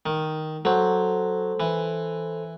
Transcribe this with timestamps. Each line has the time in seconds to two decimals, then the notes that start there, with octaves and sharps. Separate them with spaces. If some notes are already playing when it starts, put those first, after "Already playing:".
0.06 D#3
0.65 F#3 A4 C5
1.60 E3